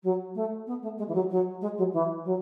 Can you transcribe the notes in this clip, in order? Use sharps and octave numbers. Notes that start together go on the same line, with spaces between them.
F#3
A3
B3
A3
G#3
E3
F#3
F#3
G#3
F#3
E3
F#3